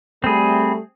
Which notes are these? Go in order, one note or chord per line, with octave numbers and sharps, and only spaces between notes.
G3 A3 C4 G#4 B5